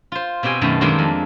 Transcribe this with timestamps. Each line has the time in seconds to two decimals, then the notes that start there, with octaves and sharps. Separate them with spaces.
0.12 F4 C5
0.43 B2 C4 G4 G5 G#5
0.61 F#2 B2 D#3 A3
0.81 D#3 G3 G#3 A#3 C4 D4
0.98 F2